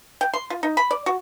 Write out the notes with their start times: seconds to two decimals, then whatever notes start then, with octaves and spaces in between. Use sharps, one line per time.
0.21 G5
0.33 C6
0.50 F4
0.63 D#4
0.77 B5
0.91 D5
1.06 F#4